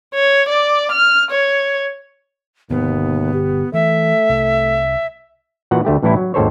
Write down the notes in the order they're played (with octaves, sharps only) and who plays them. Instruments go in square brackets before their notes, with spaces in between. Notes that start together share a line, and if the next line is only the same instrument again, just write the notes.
[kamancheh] C#5
D5
F6
C#5
[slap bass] G1 B2 [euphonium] D#2 [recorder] B3
[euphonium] G4
[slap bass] E3 [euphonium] A3 [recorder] E5
[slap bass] C2
[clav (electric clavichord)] A#2 E3 F#4 F#5
D2 A3 G4
A1 A2 E3 G3 E4
F#3
G#1 D#2 A4 C5 C#5